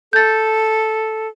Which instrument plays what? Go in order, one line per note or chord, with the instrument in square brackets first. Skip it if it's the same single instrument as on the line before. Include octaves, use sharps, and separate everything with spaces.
[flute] A4 [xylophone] G6 A6